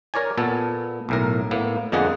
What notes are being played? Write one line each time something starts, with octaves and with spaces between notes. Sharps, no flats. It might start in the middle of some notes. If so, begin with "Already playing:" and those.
A#4 C#5 D5 G#5
A#2 B3 A4
B1 A2 A#4
A2 A#3 B3
F2 D3 G#3 A#3 G#4 F#5